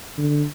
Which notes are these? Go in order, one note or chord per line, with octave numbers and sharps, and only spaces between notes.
D3